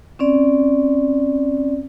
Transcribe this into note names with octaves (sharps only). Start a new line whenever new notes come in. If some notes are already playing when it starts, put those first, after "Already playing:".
C4 C#4 D5